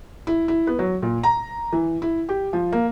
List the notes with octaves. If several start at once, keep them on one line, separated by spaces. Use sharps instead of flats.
E4
E4
B3
F#3
A#2
A#5
E3
E4
G4
F3
A#3